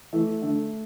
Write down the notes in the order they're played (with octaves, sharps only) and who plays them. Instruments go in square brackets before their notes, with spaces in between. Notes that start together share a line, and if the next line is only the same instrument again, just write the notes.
[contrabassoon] E3 [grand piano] A3
[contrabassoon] D3 [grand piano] A3